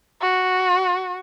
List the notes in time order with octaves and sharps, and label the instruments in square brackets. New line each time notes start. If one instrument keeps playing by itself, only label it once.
[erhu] F#4